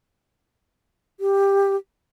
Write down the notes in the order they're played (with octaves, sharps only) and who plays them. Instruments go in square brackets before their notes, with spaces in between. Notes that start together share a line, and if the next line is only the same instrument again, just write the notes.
[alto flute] G4